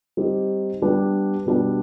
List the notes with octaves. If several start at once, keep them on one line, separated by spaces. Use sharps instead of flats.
G3 C4 D#4 G4
G3 B3 D4 G4
B2 G3 B3 D4